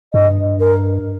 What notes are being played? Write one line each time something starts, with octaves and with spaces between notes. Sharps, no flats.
G2 D#5
A#4